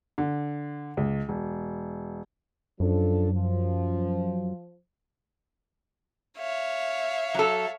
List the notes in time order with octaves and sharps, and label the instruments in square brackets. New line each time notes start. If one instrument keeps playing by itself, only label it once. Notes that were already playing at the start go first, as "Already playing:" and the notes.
[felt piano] D3
C#2
E1
[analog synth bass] F#2 [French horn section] F3 D4 A4
[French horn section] F3
[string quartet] C#5 E5 F5
[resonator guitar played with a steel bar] F#3 A4